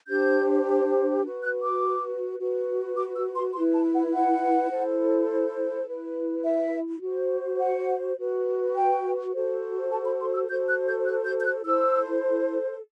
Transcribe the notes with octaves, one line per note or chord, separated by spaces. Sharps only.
D4 G4 C5 G6
F#4 B4
F#6
D6
F#4 B4
D6
E6
C6
E4 B4 C6
A5
F#5
F#5
E4 A4 C5
E4 B4
E5
F#4 C5
F#5
F#4 B4
G5
F#4 A4 C5
A5
B5
C6
E6
F#4 A4 C5 G6
F#6
G6
F#6
G6
G6
F#6
E4 A4 C5 E6